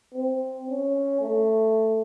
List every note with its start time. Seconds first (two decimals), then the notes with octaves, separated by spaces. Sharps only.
0.13 C4
0.70 C#4
1.21 A3